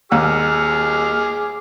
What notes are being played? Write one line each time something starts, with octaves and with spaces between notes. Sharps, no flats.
D#2 G#4 D6 F6